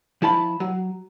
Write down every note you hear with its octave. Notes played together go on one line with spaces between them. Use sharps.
F3 E4 A5 B5
F#3